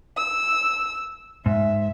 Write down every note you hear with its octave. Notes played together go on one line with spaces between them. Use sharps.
E6
G#2 E5